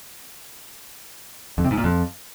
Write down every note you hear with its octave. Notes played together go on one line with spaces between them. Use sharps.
F2
C3
G#2
A#2
F2